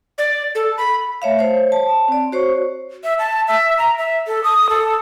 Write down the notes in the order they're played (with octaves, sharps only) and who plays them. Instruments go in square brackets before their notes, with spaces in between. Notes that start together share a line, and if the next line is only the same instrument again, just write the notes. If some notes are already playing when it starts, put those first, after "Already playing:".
[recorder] D5
A4
B5
[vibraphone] A3 C#5 E5 F5
C5 C#5
A5
C4 D5
F#4 C5 C#5 C#6
[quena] E5
A5
E5
A#5
E5
A4
D#6
A4